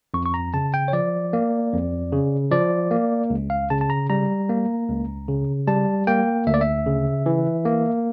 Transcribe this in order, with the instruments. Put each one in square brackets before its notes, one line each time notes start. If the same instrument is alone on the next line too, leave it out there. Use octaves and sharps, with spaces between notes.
[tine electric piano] F2 C#6
C#6
A#5
C#3 A5
G5
C#5
F3 D5
A#3
F2
C#3
F3 D5
A#3
C#2
F5
C#3 A5
A5
A#5
G3 A#5
A#3
C#2
C#3
G3 A5
A#3 G5
D2 E5
D5
E5
C#3
E3
A#3